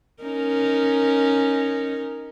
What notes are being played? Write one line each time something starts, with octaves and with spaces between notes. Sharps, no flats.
C#4 D#4 A#4